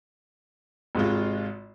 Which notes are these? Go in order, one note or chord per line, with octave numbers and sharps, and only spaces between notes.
G#1 G#2 C3 G#3 F4